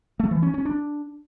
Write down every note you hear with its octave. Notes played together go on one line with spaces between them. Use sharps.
A3
E3
C#4
C#4
D4